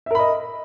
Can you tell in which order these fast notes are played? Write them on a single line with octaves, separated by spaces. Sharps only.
E5 A#4 B5 D#5